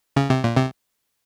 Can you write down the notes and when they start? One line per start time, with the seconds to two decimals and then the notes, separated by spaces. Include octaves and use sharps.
0.16 C#3
0.30 C3
0.44 A#2
0.57 C3